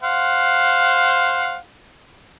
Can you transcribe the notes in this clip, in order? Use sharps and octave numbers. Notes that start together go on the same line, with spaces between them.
C5 F5 F#5